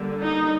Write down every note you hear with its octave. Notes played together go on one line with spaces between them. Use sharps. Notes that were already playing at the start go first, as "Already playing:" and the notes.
Already playing: D3 G3 A#3
D#4